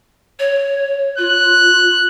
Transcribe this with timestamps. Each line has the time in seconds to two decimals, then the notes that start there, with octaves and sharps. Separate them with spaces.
0.39 C#5
1.18 F4 F#6